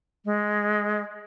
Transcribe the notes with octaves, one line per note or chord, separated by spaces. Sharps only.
G#3